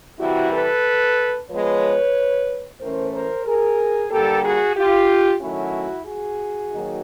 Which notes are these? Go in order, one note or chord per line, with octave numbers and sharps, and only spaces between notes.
C3 E3 G3 E4 F#4
A4 B4
F3 G#3 B3 B4 C#5
A2 E3 A3 C#4 A#4 C5
A#4 C5
G#4 A#4
D3 G3 A#3 G4 A4
F#4 G#4
F4 G4
D#3 F#3 A3 C#4 E4 F#4
F#4 G#4
D#3 F#3 A#3 D#4